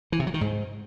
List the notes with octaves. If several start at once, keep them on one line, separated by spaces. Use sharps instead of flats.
E3
C3
F#3
D#3
G#2